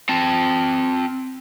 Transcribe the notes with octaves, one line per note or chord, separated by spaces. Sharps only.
C4 A5